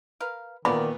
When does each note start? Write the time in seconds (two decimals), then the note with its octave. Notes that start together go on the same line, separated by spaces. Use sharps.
0.20 A#4 B4 F5
0.65 A#2 D#3 F#3 B3 E4 F4 D5 B5